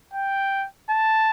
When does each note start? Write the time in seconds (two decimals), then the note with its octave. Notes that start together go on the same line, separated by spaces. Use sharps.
0.14 G5
0.90 A5